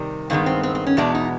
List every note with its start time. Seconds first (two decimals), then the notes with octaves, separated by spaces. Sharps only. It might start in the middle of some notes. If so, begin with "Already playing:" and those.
Already playing: C3 D#3 G3
0.30 G2 D#3 G#3 B3 C4
0.46 C4
0.63 C4
0.75 C4
0.87 C#4
0.97 E2 B2 G#3 B3 D4
1.15 D#4